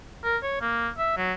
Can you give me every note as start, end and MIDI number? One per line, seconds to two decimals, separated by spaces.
0.24 0.37 70
0.43 0.57 73
0.61 0.89 58
0.98 1.13 76
1.17 1.33 54